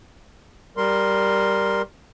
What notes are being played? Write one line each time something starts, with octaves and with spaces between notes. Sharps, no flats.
G3 A#4 C6